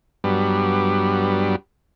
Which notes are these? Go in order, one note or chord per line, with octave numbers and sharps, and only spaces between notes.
G2 F#3 G3 B3 D4